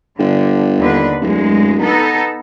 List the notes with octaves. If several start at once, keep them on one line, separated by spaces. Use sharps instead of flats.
G1 D3
D#2 D3 B4
D1 F#2 G#3
B3 D#4 A4